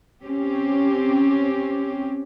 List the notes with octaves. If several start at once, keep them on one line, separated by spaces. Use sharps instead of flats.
C4 C#4 G4